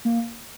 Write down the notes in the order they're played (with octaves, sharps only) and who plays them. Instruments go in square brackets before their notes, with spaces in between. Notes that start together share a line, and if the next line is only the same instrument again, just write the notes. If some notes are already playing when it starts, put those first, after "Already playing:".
[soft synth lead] A#3